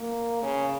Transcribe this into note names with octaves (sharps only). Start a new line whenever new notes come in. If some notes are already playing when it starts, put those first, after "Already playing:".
Already playing: A#3
C#3